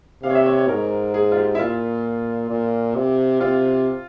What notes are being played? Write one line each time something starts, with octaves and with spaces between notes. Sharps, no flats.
C3 F5
C#5
E5
C#5
C#5
G#2 A#4
G#4
F4
G4
E4
A#2 F4
A#2
C3
C3 F4